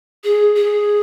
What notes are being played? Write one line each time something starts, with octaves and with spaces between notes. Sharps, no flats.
G#4
G#4